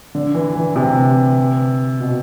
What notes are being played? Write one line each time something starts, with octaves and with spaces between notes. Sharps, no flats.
D3
E3
E3
C3
B2